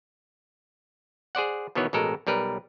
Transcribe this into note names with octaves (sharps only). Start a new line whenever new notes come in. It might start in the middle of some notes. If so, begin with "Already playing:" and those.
G#4 C5 D5 F#5
B2 D#3 E3 B3 C#5
A1 B2 G#3 A4 A#4
B1 G3 A#4 B4